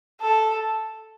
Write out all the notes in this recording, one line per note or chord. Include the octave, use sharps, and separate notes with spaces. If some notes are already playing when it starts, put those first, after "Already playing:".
A4